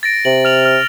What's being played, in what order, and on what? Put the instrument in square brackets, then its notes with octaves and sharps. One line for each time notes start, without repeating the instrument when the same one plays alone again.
[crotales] A6 A#6 D7
[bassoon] C3 [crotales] F#7
[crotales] F6 F7 F#7
F6